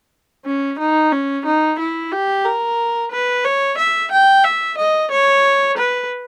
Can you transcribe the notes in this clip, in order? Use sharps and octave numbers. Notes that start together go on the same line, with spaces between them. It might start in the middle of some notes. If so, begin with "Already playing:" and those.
C#4
D#4
C#4
D#4
E4
G4
A#4
B4
C#5
E5
G5
E5
D#5
C#5
B4